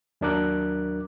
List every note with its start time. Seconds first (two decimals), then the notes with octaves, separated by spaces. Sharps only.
0.21 D#2 F#3 D4 A#4 D6 F#6